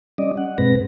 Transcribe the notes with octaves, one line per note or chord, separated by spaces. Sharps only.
G3 C#4 D5 D#5
F#5
G2 B2 G#3 C4 B4 A#6